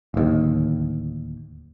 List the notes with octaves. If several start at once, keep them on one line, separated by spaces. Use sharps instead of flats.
D1 D#2